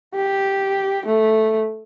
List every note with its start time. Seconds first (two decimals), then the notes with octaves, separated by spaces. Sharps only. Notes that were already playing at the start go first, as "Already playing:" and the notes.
0.15 G4
1.06 A3